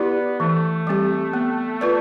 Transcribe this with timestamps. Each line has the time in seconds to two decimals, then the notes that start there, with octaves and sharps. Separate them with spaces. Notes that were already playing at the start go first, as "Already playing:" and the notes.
Already playing: B3 E4 G4 D5
0.40 E3 A3
0.87 G3 C4 G4
1.33 B3
1.81 F4 B4 D5